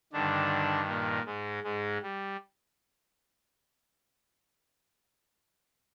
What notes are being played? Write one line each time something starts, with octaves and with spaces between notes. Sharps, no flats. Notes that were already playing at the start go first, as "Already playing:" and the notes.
G2 D3 D#3 D4
A#2 A#3
G#2 G#3
G#2 G#3
G3